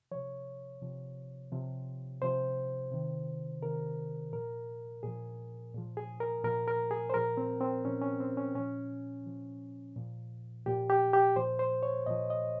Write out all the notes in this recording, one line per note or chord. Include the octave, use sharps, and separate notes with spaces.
C3 F3 C#5
C3 F3
C3 F3
C3 F3 C5
C3 D#3
C3 D#3 A#4
A#2 F3 A#4
A#2 F3 G#4
A#2 F3
G#4
A#4
A#2 F3 A#4
A#4
G#4
C5
A#2 F3 A#4
C4
C4
A#2 F3 C#4
C#4
C4
C#4
A#2 F3 C#4
A#2 F3
A#2 F3
A#2 F3 G4
G4
G4
A#2 F3 C5
C5
C#5
A#2 F3 D#5
D#5